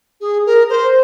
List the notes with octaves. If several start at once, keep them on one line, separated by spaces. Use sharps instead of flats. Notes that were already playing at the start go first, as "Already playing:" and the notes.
G#4
A#4
C5